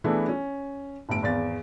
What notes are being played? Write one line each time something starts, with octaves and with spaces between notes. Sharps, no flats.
E3 A3 B3 D4 E4 G#4
C#4
G1 A2 D7
G#1 E2 A6